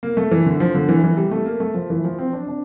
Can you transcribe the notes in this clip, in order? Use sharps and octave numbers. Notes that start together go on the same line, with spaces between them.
A#3
A3
E3
D3
F3
D3
E3
E3
G3
A3
A#3
A3
F3
E3
F3
C4
D4
D4